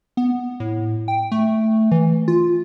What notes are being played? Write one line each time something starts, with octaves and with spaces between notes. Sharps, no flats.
B3
A2
G5
A3
E3
F4